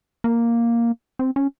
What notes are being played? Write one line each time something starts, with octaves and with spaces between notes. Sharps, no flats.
A#3
C4
C#4